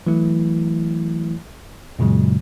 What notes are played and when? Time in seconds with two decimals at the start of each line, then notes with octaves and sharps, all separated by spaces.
0.07 E3 F#3 A3 E4
1.99 F#2 A#2 C#3 F#3 G#3